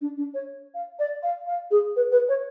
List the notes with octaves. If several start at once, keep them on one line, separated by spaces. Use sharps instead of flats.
D4
D4
C#5
F5
D5
F5
F5
G#4
B4
B4
C#5